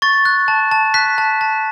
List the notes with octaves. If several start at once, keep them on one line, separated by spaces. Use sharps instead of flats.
C#6 A6
F#6
A5
A5
F#6 B6
A5
A5